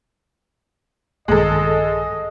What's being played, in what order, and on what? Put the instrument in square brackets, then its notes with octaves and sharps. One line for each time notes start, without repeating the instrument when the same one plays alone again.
[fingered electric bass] A#1 G2 D#3 [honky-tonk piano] G#3 A4 [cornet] D#5